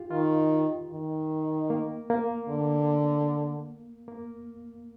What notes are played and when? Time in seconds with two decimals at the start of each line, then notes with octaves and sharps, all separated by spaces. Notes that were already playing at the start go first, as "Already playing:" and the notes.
Already playing: F4 G4
0.11 D#3 F4
0.91 D#3
1.70 A#3
2.10 A#3
2.49 D3
4.08 A#3